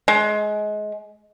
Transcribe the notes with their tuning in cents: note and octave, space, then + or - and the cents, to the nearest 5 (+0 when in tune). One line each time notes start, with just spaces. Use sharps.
G#3 +25